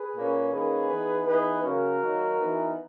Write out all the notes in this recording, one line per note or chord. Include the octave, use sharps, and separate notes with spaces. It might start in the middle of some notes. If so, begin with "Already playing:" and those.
Already playing: G#4 B4
A#2 A#3 C#4
D#3 A#3 C#4 G#4 B4
E3 B3 D#4
E3 B3 D#4 G#4 B4
C#3 F#3 A#3 C#4 F#4 A#4
D#3 F#3 A#3 D#4
E3 B3 D#4